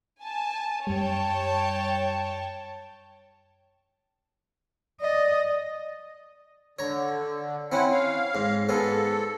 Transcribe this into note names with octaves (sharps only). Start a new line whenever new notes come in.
G#5 A5
F#2 G3 C#5 G5 A5
D5 D#5
D3 C#5 A#5
C4 C#4 E4 F#5
F5
G#2
G#2 G#3 B3 A4